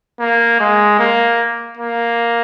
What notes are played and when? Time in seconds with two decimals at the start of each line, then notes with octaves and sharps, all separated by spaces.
0.20 A#3
0.60 G#3
0.99 A#3
1.78 A#3